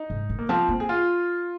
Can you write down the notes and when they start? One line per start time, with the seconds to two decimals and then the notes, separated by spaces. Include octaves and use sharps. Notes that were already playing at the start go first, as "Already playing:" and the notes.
Already playing: D#4
0.10 G#2
0.29 D#3
0.39 A#3
0.49 F3 C4
0.69 A#3
0.80 G#4
0.89 F4